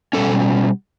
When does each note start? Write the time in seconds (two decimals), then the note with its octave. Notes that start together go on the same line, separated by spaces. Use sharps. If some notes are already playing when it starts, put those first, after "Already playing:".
0.13 B2 G3 C#4 A4